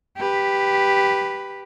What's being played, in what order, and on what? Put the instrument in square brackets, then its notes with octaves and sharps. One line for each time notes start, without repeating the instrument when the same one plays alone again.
[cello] G4 B4